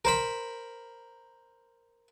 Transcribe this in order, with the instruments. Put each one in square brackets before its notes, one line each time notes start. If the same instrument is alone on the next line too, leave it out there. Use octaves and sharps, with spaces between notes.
[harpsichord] A#4 C5 B5